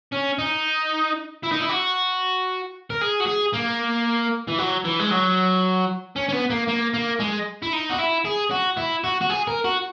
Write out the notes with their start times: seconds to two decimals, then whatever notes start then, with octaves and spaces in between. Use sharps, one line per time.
0.13 C#4
0.39 D#4
1.44 E4
1.52 D#4
1.61 E4
1.69 F#4
2.90 A#4
3.01 G#4
3.20 F#4
3.27 G#4
3.54 A#3
4.48 E3
4.58 F#3
4.85 E3
4.99 G#3
5.11 F#3
6.16 C#4
6.29 C#4
6.32 B3
6.50 A#3
6.68 A#3
6.94 A#3
7.20 G#3
7.62 E4
7.73 D#4
7.90 F#4
7.99 E4
8.25 G#4
8.51 F#4
8.77 E4
9.04 F#4
9.21 F#4
9.30 G#4
9.47 A#4
9.65 F#4